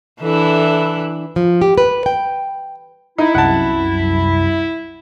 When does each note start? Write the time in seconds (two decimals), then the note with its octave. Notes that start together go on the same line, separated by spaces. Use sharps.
0.21 E3 D4 E4 A4
1.36 F3
1.61 G4
1.78 B4
2.06 G5
3.18 D#4 E4
3.35 C2 F#2 F#5 A5